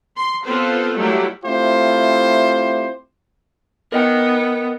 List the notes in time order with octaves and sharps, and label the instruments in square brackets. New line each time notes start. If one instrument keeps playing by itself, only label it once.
[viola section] C6
B3 C4 F4 A4 B4 C5
F#3 G3 A3 A#3 E4 G4
[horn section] A3 C4 E4 F4 G4 C5
[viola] B3 [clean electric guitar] A#4 D#5 G5